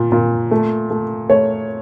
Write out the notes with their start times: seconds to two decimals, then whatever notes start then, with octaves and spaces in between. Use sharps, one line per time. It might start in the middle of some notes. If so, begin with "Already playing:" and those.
Already playing: A#2
0.12 A#2
0.51 A3
0.90 A3
1.30 A3 C#5